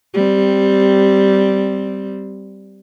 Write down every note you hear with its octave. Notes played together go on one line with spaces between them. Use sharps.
G3 C4